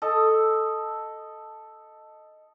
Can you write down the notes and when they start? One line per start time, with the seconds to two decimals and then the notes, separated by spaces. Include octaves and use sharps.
0.02 A4 D#5